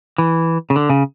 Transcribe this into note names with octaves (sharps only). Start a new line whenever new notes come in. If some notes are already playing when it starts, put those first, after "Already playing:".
E3
C#3
D3
C#3